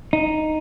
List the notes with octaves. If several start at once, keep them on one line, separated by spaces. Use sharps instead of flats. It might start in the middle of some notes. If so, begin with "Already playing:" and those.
D#4